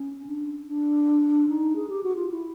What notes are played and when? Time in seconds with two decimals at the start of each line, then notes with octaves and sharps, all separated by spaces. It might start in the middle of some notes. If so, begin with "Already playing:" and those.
Already playing: C#4
0.27 D4
0.67 D4
1.49 D#4
1.76 G#4
1.89 G4
2.03 F#4
2.16 F4
2.30 E4